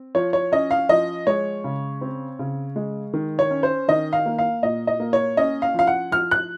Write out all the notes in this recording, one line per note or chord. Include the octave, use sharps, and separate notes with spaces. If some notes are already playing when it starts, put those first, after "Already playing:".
Already playing: C4
F3 C#5
C#5
C#4 D#5
F5
F3 D#5
G#3 C#5
C#3
C4
C#3
G#3
D#3
C#5
C#4
C5
D#3 D#5
F5
A#3
F5
A#2 D#5
D#5
A#3
C#5
C#4 D#5
F5
F3 F5
F#5
F3 F6
F#6